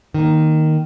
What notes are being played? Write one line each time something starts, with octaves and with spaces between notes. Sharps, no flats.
D#3 A#3